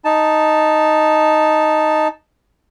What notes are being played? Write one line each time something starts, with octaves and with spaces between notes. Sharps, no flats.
D#4 A5